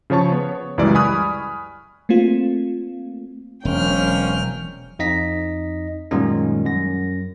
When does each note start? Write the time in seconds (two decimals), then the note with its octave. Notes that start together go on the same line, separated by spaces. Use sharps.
0.10 C#3 F3 C#5 A5 C#6
0.32 B3 C#5
0.78 C#2 F#2 E3 G3 G#3 D5
0.95 G#5 B5 C#6 D#6 F6 F#6
2.09 A3 A#3 C4 F4
3.65 E1 F#3 A#3 C4 C#4 G5 F6
4.99 F2 D#4 D#5 A#6 B6
6.11 F#2 A#2 D#3 G3 G#3 C#4
6.65 F#2 A#6